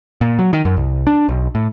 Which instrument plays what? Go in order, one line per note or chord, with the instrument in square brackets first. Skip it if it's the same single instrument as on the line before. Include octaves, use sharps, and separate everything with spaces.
[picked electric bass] A#2
F#3
D#3
F#2
C2
D4
B1
A2